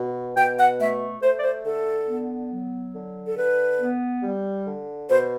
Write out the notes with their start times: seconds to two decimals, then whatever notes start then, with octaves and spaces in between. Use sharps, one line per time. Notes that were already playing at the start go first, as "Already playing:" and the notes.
Already playing: B2
0.36 B2 G5
0.58 F#5
0.79 A3 E5
1.22 A3 C5
1.39 D5
1.43 C5
1.65 D3 A4
2.08 B3
2.51 F#3
2.94 D3
3.26 A4
3.37 D3 B4
3.80 B3
4.23 G3
4.66 D3
5.08 B2 C5